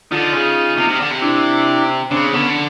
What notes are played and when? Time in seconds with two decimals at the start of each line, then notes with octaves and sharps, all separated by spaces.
0.11 D3 D#4 F4
0.33 C#3
0.77 C3
0.88 C3
1.00 D3
1.11 C3
1.22 D4 E4
2.10 C#3 C4 D4
2.33 D3 B3 C#4